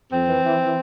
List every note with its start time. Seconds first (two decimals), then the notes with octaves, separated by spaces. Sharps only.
0.13 F2 C4
0.28 E3
0.44 E3
0.60 E3